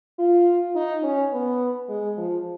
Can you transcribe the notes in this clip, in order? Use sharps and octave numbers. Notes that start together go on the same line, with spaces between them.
F4
D#4
C#4
B3
G#3
F3